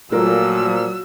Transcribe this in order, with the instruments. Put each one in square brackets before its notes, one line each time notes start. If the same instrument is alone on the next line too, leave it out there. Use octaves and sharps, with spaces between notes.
[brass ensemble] A#2 F3 [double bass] F#3 [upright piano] A3 F4 A#4 [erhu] E6